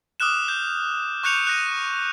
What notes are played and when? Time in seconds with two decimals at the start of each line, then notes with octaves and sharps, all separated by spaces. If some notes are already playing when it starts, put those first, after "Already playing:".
0.20 D6 D#6 F6 F#6 E7
0.48 G6
1.23 C#6 D6 F#6 G6 C#7 F7
1.47 F#6 A#6 D#7